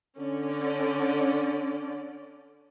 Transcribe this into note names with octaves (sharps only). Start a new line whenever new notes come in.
D3 C#4 D5